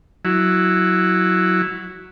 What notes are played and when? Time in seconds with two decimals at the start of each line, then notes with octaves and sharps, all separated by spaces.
0.25 F#3 E4